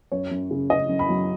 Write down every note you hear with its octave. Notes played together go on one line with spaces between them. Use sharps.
F#2 C#5
F#2
C#3
C#3 D#5
F#2
B5
F#3